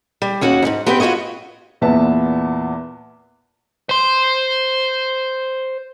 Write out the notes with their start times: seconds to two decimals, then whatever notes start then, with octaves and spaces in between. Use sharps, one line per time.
0.22 G3
0.41 D#2 C#4 F#4 F#5
0.62 F2 G#2
0.86 B3 C4 G4 B4 G5
1.00 F4 F#4 G#4 C#5 D#5
1.81 E2 A#2 B3 E5 A5
3.89 C5 C6